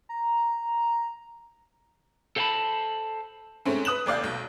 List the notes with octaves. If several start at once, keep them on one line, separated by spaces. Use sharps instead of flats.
A#5
A4 C5 F5 F#5 A5 B5
G#2 A3 C4 C#4
B4 D#6 F#6 E7 F#7
F1 D#2 D5 F5 G6
B1